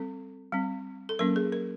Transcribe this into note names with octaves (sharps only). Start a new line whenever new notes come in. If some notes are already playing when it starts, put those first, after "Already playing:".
Already playing: G3 C4 A4
G3 C4
A4
F#3 A#3 C#4 A#4
G#4
A#4